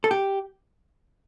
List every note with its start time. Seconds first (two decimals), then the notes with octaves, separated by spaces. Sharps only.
0.04 A4
0.11 G4